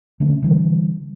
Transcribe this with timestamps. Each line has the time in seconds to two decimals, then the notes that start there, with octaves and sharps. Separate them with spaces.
0.20 D3 A3 C#4
0.42 D3 E3 G3